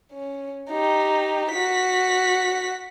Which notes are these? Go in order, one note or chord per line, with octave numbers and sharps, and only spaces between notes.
C#4
D#4 G4
F#4 B6